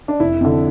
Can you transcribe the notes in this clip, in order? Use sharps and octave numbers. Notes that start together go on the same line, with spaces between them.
D4
F1 E4
F2 D3